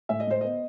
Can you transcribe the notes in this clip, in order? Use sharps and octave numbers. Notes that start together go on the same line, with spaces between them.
A2 E5
D#5
A2 C5
B3 D#5